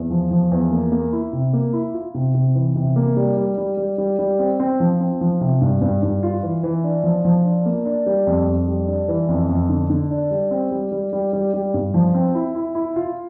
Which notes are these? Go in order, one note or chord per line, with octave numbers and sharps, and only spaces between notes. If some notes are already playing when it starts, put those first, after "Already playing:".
Already playing: E2
F3
F3
E2
A#3
A#3
E4
C3
A#3
E4
F4
C3
C3
E3
C3
A#3
G3
G3
G3
G3
G3
G3
C4
C4
F3
C4
F3
C3
G2
G2
G2
F4
E3
E3
D4
F3
F3
D4
A#3
D4
G3
F2
F2
G3
D4
E3
F2
F2
D3
D3
D4
G3
C4
G3
G3
G3
G3
G3
G2
F3
C4
E4
E4
E4
F4